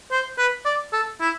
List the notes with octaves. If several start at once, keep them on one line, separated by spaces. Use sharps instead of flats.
C5
B4
D5
A4
E4